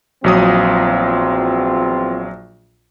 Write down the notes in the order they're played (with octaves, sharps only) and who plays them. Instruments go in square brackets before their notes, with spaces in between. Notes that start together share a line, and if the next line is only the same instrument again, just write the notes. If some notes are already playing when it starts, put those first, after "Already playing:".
[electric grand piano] A#1 F#3 D#6 [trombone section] E2 C4 F4